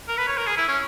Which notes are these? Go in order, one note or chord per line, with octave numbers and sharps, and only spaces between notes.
A#4
B4
C#5
A#4
G#4
E4
C#4